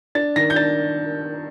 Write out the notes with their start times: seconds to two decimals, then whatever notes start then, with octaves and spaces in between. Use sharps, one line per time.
0.15 D4 A6
0.36 D#3 A#6
0.50 G6
0.56 D4 A6